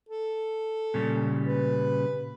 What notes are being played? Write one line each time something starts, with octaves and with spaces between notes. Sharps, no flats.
A4
A#2 C#3 G3
B4